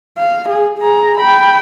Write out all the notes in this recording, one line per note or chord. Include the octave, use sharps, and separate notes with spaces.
F5
G#4
G#4 A#5
G5 B5